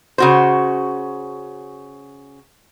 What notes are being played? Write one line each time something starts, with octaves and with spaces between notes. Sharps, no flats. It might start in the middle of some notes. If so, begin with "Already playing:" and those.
C#3 F#4 C5